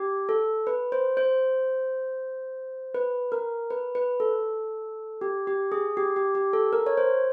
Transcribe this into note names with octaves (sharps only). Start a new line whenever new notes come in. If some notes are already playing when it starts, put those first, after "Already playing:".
Already playing: G4
A4
B4
C5
C5
B4
A#4
B4
B4
A4
G4
G4
G#4
G4
G4
G4
A4
A#4
C#5
C5